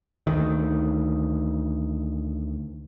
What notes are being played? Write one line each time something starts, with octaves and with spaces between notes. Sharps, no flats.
D2 D#3